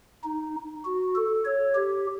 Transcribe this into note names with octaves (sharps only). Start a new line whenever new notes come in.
D#4
F#4
A4
C#5
G4